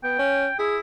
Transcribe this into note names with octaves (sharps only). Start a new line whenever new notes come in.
B3 G5
C#4
E4 G#4